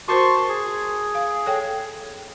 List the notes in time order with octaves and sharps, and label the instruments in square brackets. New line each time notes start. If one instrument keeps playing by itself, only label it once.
[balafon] F#4 A#4 C5 [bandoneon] A5 C6 C#6
[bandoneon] G#4
[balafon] F5
A4 C#5 G5